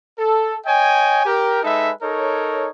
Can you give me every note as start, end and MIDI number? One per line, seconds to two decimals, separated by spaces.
0.19 0.56 69
0.66 1.25 73
0.66 1.25 75
0.66 1.25 79
0.66 1.25 80
1.26 1.63 67
1.26 1.63 70
1.64 1.91 56
1.64 1.91 63
1.64 1.91 69
1.64 1.91 71
1.64 1.91 76
2.03 2.69 63
2.03 2.69 69
2.03 2.69 70
2.03 2.69 73